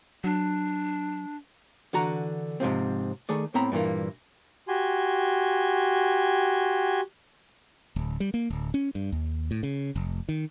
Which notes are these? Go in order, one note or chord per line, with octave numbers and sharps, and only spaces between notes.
F#3 D4
D3 E3 F#4 A#5
G#2 C3 F3 C4
D#3 A3 G#4 D5
A2 B3 C4 A#5 B5
G2 A#2 E3 A#3
F#4 G4 G#5 C6
D1
G3
A#3
D1
C#4
G2
D#2
A2
C#3
F1
D#3